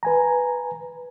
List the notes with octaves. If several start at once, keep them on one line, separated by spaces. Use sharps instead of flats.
B4 G#5 A#5